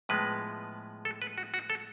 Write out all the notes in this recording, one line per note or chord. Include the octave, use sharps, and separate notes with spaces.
A2 F3 G#3 B3 B4
A4
B4
F#4
F#4
A4